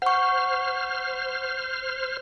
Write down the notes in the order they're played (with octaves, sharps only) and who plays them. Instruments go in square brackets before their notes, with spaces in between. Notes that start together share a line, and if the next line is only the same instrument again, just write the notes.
[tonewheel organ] C5 F6 [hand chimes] F#5 C#6